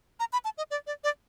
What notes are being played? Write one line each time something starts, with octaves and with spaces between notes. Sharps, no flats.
A#5
B5
A5
D#5
D5
D5
D5